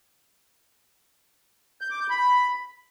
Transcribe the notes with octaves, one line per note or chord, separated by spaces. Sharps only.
G6
D6
G6
B5